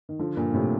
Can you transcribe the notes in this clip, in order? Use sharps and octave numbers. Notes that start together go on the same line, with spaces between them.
D#3
D3 F3
G2 A#2
A2 C3